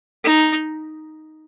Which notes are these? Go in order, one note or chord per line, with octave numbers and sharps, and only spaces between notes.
D#4